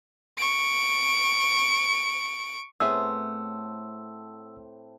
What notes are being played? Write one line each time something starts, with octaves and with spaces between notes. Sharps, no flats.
C#6 D7
A2 B3 C4 G#4 E5 E6